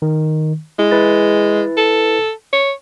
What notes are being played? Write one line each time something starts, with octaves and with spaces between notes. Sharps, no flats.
D#3
G#3 E4
E4 B4 A6
A4
C#5